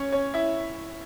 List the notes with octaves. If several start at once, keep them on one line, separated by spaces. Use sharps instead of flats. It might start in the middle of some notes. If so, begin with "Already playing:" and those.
Already playing: C#4 C#5
C#4 C#5
E4 E5